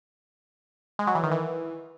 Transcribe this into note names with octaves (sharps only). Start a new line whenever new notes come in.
G#3
F#3
E3
D#3
E3